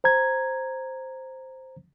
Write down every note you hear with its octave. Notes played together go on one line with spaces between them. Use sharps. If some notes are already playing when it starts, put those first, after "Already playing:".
C5 A#5 G#6